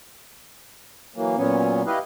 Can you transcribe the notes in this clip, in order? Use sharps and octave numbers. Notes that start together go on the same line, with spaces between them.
E3 F#3 A#3
A#2 F#3 B3 C#4
E4 G4 B4 D#5 F5